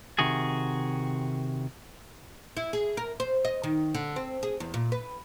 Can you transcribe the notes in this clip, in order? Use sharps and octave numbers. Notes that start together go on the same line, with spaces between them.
C3 D#3 F#4 G#4
E4
G#4
A#4
C5
D#5
D#3
D3
C4
G#4
E2
A#2
B4